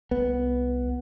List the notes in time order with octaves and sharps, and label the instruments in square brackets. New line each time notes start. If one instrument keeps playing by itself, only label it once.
[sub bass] C2 [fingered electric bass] B3